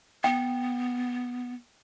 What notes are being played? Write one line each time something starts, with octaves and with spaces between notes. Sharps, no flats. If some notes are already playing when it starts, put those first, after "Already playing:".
B3 G5